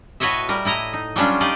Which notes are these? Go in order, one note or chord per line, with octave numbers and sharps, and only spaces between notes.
A2 F#4 B4 C#5 D#5 E5
G3 A#4
A2 E4 D#5 A#5
D#4
F#3 G3 C#4 D4 F4
D#4 F4 G4 D5 D#5